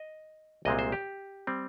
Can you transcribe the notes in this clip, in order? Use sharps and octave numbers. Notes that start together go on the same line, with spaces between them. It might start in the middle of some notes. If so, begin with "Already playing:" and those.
Already playing: D#5
C2 A#2 G#3 C4 D#5
C5
G4
G3 C4